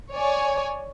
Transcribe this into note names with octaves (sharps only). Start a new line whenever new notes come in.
C#5 D5 G#5